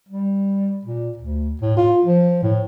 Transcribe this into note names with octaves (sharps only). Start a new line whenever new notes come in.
G3
A#2
D2
A2
F4
F3
A2